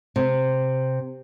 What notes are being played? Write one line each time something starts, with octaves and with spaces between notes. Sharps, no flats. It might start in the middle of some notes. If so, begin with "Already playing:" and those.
C3